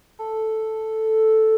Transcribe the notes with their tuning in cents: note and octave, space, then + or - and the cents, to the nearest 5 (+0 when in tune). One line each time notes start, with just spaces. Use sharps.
A4 +0